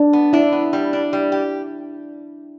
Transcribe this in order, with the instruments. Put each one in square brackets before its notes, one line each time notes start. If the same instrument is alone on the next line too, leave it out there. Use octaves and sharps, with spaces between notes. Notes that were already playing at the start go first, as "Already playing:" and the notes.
Already playing: [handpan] D4
[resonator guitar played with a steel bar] B3
[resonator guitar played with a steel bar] D4 [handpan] E4
[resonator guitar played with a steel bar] B3
G3
D4
G3
G4